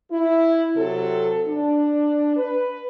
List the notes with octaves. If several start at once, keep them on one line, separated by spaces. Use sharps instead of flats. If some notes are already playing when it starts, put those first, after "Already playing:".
E4
C3 F#3 A4
D4
B4